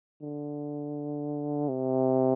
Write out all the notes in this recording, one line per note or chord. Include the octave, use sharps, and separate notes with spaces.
D3
C3